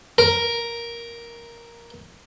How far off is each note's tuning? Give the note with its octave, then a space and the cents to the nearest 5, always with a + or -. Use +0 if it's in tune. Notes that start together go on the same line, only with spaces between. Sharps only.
A#4 +5